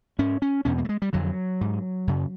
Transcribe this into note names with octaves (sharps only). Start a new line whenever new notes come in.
G#2 C#4
C#4
E2 B2 C#4
A#3
A3
G#3
G3
F2 D3 F#3
G#2
F#2 C#3